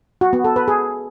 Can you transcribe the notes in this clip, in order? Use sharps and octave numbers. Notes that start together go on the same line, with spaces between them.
F#4
B3
A4
B4
G#4